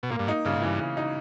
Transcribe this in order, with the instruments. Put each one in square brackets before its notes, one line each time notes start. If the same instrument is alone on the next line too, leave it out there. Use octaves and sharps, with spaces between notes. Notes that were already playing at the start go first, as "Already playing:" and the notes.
[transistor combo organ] B2
[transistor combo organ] A#2 [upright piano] A#3
[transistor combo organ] G2
[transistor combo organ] G#2 [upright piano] D#4
[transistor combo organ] G2 [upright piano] C#3
[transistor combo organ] G#2
[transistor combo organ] G2 [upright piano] E3
[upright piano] C#3
D#4